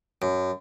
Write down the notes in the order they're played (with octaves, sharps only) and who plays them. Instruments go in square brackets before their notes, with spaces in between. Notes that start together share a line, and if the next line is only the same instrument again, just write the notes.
[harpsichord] F#2